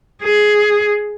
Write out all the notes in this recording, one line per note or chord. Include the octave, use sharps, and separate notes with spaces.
G#4